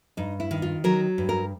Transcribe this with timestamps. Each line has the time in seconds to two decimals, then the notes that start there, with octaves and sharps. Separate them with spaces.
0.17 G2 D#4
0.40 E4
0.51 D#3
0.62 F4
0.84 F#3 A#4
1.18 G2
1.29 A#4